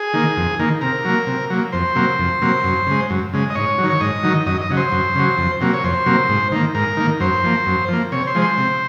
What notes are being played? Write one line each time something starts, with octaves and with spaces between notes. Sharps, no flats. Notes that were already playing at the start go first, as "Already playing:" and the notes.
Already playing: G#4
D#3 A#3
F2
D#3 A#3
C3 A#4
F#3 A#3
C3
F#3 A#3
F2 C5
C3 F#3 A#3
F2
C3 F#3 A#3
F#2
C#3 G#3
F#2
C#3 G#3
D#5
G#2 C#5
D#3 F#3
C#5
G#2 D#5
D#3 F#3
F#2 D#5
D#5
C#3 F#3
C5
F#2
C#3 F#3
F2
C3 F#3 A#3
C#5
F2 C5
C3 F#3 A#3
G#2
D#3 A#3
G#2 A#4
D#3 A#3
F#2 C5
F3 A#3
F#2
F3 A#3
C3 C#5
C5
F3 G#3
C5
C3